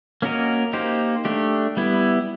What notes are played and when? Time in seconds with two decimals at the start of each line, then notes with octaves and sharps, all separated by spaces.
0.22 A#3 C#4 F#4 A#4 D#5
0.73 A#3 D#4 G4 C5
1.25 A3 D4 G4
1.77 G3 B3 E4